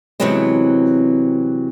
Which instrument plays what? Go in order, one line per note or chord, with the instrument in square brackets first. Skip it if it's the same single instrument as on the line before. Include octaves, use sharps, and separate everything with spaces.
[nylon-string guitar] C3 E3 F#3 G#3 B3 C4